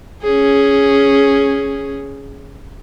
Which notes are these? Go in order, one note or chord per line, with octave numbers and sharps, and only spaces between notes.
C#4 G#4